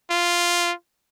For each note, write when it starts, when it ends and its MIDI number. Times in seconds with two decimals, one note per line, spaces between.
0.10 0.72 65